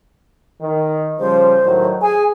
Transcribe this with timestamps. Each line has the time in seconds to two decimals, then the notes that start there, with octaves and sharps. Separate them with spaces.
0.61 D#3
1.20 C#3 F3 G3 C5
1.64 A2 D#3 F#3
2.02 G#4 G#5